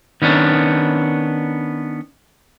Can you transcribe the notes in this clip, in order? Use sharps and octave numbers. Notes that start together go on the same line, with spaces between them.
D#3 B3 C#4 D4